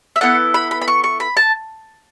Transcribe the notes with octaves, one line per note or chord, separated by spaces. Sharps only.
E5
B3 E4 A4 F#5
B5
B5
B5
C#6
C#6
B5
A5